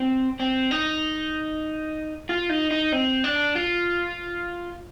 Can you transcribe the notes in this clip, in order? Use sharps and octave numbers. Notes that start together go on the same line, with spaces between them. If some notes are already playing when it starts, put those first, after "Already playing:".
Already playing: C4
C4
D#4
F4
D#4
D#4
C4
D4
F4